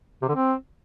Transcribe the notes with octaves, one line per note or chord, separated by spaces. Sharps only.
C3
D3
C4